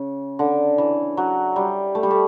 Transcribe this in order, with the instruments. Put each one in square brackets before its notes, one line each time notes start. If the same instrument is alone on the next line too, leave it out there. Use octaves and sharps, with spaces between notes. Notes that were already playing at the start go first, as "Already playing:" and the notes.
Already playing: [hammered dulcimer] C#3
D3
E3
F#3
G3
A3
G3
A3